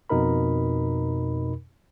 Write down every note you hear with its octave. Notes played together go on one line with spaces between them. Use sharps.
F2 B2 D#4 A#4 B5